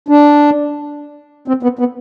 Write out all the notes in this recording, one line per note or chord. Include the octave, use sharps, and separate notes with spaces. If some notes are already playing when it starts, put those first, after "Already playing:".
D4
C4
B3
B3